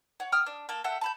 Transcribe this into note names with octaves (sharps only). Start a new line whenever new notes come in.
C#5 F#5
G5 D#6 F6
D4
A#3 A4
A4 E5 F#5 G5
A5 B5 G6